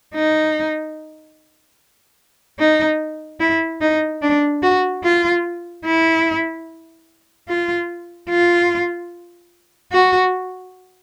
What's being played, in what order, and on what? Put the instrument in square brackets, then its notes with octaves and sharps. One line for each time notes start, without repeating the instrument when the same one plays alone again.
[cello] D#4
D#4
E4
D#4
D4
F#4
F4
E4
F4
F4
F#4